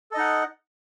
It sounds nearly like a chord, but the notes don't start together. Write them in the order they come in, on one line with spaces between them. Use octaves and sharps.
A4 D#5 D#4 F#5